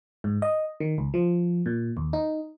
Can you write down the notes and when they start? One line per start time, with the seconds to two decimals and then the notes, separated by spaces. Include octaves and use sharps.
0.24 G#2
0.42 D#5
0.80 D#3
0.98 C#2
1.14 F3
1.66 A#2
1.97 D#2
2.13 D#4